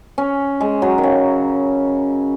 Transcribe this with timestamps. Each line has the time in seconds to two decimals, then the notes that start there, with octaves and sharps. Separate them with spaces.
0.18 C#4
0.61 G#3
0.82 F#3
0.98 D#3
1.03 C#3